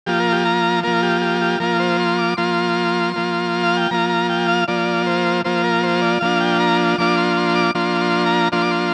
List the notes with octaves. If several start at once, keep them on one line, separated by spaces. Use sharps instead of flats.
F3 A#3 F4 G4
A#4
G4
A#5
F3 A#3 F4 A#4
G4
G4
G4
F3 A#3 F4 A#4
C5
C6
D6
F3 A#3 F4 C6
F3 A#3 F4
F5
G5
F3 A#3 F4 A#5
A#5
G5
F5
F3 A#3 F4 D5
C5
F3 A#3 F4 C5
A#4
C5
D5
F3 A#3 D4 F4 F5
G5
A#5
F3 A#3 D4 F4 D6
C6
C6
D6
F3 A#3 D4 F4 C6
C6
A#5
F3 A#3 D4 F4 C6
D6
C6